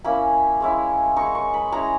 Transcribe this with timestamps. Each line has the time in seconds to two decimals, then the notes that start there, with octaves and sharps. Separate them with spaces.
0.04 A#3 C#4 E4 B5
0.61 G#3 C#4 E4
1.16 G#3 D#4 C#6
1.35 C#6
1.54 B5
1.72 G#3 C#4 E4 A#5